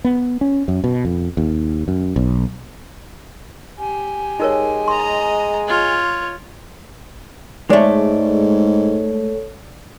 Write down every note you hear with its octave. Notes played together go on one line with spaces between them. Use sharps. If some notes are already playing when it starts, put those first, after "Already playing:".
B3
C#4
F#2
B2
F2
D#2
F#2
B1
G4 G#5
G#3 D#4 A#4 C#5
D#5 A#5 C6
F4 C#5
G#2 G#3 A3 A4 C#5 D5